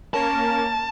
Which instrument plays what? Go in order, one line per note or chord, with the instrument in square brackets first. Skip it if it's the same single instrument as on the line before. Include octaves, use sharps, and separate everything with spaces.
[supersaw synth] A#3 C#4 A#4 [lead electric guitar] A5